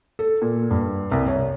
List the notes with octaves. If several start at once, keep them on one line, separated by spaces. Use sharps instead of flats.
A4
A#2
G2
C2
C#5